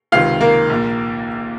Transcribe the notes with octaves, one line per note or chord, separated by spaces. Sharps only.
C#2 C3 D#3 F4 F5
A#3 A#4
A#1 A#2